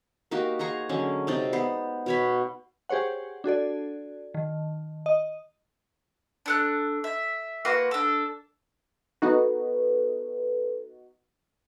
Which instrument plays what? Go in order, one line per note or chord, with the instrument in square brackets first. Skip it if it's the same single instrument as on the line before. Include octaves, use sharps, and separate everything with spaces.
[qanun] A#3 D#4 F#4 G4
G#4 C5 A#5 C#6
D3 F#3 G#3 C#4
C3 D#4 D5
B3 C5
B2 C#5 B5
[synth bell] G4 G#4 C5 C#5 F#5
D4 F#4 A4 D5
D#3
D#5
[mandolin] D4 A4 F#6
E5
A#3 F#4 B4 C6
D4 A4
[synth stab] B3 D#4 F#4 [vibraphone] A4 B4